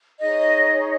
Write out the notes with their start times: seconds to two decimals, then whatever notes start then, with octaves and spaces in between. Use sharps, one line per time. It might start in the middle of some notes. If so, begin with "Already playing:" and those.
0.20 D#4 G#4 C#5 D#5